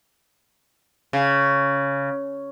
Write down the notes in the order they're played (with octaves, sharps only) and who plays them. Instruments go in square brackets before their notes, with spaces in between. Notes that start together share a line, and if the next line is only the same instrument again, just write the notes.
[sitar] C#3